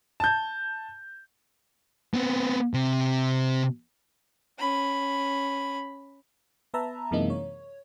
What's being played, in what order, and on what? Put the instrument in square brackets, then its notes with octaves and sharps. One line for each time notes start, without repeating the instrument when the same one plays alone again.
[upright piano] A5 G6
[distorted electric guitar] B3 C4
C3
[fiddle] C#4 B5
[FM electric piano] B3 B4 E5 A5 A#5
F#2 C3 E3 G#3 A#3 D#4
C#5